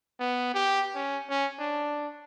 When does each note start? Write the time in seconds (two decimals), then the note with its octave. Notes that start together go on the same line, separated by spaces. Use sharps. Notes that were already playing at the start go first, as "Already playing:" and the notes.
0.20 B3
0.54 G4
0.95 C#4
1.30 C#4
1.59 D4